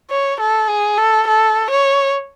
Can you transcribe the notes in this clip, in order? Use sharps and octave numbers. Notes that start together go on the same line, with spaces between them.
C#5
A4
G#4
A4
A4
C#5